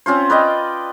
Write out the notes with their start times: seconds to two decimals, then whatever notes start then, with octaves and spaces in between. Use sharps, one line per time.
0.06 C4 C#4 F4 C5
0.30 B4 D5 D#5 G5